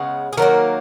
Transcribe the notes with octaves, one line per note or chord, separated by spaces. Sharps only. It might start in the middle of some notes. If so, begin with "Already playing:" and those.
Already playing: C#3 G#3 B3
G#4
D#3 F#3 A#3 A#4